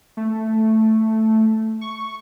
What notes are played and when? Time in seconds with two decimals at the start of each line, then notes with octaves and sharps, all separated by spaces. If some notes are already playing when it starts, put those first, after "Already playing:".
0.17 A3
1.81 C#6